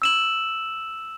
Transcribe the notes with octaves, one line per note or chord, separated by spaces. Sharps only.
E6 E7 F#7